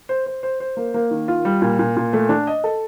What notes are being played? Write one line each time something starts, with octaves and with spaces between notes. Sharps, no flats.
C5
C5
C5
C5
A#3
A#3
D#3
F4
G3
A#2
A#2
A#2
A3
D4
D#5
A4